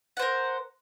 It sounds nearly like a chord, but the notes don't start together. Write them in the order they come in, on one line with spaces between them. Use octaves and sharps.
F#5 C5 A#4